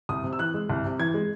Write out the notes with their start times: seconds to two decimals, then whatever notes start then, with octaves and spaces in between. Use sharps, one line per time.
0.09 C2 D#6
0.24 C3
0.33 E6
0.39 E3 F#6
0.54 G#3
0.70 C2
0.84 C3
0.99 E3 G#6
1.14 G#3